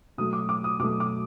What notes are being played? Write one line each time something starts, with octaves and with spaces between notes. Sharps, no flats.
B2 F#3 A3 D#6
D6
D6
D#6
B2 F#3 A3 D6
D6